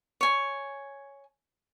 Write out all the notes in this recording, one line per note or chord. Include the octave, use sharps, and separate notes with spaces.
C#5 G#5